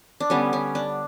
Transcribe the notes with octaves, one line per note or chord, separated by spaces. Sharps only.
D4
D3 G3 B3 C#4
C#4
D4